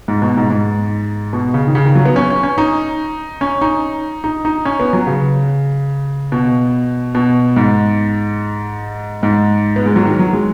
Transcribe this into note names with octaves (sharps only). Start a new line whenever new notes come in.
G#2
B2
G#2
G#2
B2
C#3
D#3
C#3
D#3
F#3
B3
C#4
C#4
C#4
D#4
C#4
D#4
D#4
D#4
C#4
B3
F#3
C#3
B2
B2
G#2
G#2
B3
G#3
F#3
D#3
F#3
G#3